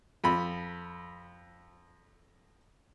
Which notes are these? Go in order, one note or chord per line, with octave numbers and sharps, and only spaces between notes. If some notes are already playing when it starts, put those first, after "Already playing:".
F2 B5